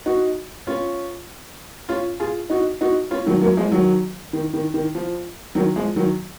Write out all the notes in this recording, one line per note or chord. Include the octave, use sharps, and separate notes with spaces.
D#4 F#4
C#4 F4
C#4 F4
F4 G#4
D#4 F#4
D#4 F#4
C#4 F4
D#3 F#3
F#3 A#3
F3 G#3
D#3 F#3
D#3
D#3
D#3
F3
D#3 F#3
F3 G#3
D#3 F#3